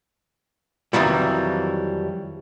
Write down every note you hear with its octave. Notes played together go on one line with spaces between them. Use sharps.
F2 D#3 E3 F#3 G3